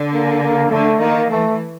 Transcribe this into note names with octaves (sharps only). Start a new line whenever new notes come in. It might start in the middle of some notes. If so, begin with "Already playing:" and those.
Already playing: D3
A#3
A#3
D3 A3
D#3 A#3
E3 A3